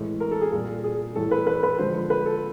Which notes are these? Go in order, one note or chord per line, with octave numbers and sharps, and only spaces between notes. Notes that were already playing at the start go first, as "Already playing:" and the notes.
Already playing: A2 E3 G#3
A#4
A4
G#4
A#2 G3
G#4
A2 E3 G3 A4
B4
B4
B4
D3 F3 G#3 C5
B4
A4